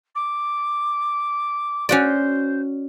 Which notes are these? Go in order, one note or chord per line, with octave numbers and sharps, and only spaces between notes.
D6
C#4 F#4 C5 D5